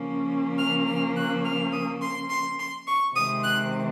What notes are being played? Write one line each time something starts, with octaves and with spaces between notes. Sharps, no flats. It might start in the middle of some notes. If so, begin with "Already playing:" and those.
Already playing: C#3 F3 A#3 C#4
F6
F6
F#6
F6
D#6
C6
C6
C6
C#6
C3 D#3 G#3 C4 D#6
F#6